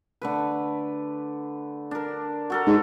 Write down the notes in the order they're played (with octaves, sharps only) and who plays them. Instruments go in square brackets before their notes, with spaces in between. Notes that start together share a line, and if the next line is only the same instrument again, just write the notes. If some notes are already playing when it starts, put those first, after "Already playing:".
[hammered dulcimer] D3 A3 B4
D4 A#4
F#4 A4 A#4
[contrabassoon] G#2 [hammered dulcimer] F#5